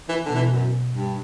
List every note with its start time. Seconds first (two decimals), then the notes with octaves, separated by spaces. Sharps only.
0.09 E3
0.26 B2 D3
0.35 E3
0.51 F#2
0.93 G2